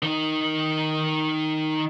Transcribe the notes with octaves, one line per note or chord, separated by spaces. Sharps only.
D#3 D#4